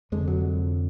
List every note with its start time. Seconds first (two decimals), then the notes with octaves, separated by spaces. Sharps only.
0.12 F1 F2 D3 G#3
0.28 F#3